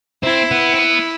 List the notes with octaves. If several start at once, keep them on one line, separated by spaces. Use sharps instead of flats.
C4 E4
B3
C4
B3